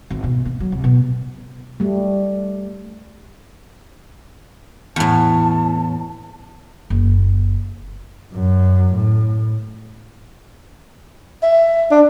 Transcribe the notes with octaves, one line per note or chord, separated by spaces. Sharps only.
G#1
B2
A#3
F#3
C2
B2
G3 A3
E2 A2 A5
F#1
F#2
A2
E5
D4